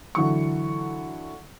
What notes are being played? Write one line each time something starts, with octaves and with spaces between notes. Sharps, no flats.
D3 E3 F#3 C#6